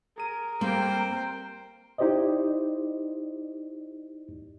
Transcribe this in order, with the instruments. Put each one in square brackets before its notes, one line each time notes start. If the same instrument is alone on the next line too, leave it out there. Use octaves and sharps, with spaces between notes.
[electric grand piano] G#4 D#7 [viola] A#4
[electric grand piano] G3 C4 [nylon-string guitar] A#3 [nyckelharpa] C5 G5
[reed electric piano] D#4 E4 G4 C5 D5 D#5